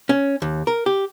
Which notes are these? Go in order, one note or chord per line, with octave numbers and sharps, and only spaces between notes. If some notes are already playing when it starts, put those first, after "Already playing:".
C#4
D#2
A#4
G4